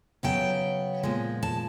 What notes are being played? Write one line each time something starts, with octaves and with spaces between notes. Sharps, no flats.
C#3 F#3 B3 G5
A#2 F3 G#3
A5